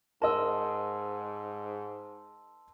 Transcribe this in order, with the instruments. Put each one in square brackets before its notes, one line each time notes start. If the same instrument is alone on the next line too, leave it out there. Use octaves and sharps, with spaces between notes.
[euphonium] G#2 [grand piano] A#4 D#5 [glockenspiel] A5 C6 E6